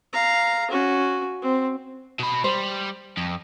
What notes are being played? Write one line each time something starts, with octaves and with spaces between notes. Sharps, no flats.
F5 A#5
C#4 F#4
C4
B2 B5
G3 C5
F2